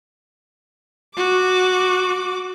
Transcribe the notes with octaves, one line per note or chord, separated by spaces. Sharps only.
F#4 D6